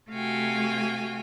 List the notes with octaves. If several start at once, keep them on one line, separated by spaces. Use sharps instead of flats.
C3 A3 F#4 F5 G5 G#5